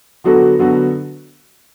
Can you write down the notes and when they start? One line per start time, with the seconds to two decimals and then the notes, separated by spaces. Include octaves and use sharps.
0.24 D3 F#3 B3 F#4 A4
0.59 D3 F#3 B3 F#4 A4